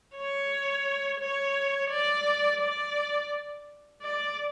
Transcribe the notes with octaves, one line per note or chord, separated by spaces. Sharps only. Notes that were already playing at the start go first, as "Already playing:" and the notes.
C#5
C#5
D5
D5
D5